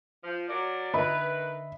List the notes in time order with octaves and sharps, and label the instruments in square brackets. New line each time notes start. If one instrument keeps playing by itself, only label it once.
[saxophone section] F3
F#3 A#4 D5
[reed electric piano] D3 D#5 E5 [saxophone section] D#3 B4 [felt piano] B5